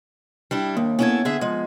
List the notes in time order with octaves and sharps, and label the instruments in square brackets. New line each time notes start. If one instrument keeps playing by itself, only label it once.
[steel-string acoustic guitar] G3 D4 E4
[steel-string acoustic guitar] D#2 [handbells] A#3
[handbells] B3 G#6 [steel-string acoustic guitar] C#4 E4 A4
[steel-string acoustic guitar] D3 G#4 E5
F3 G#3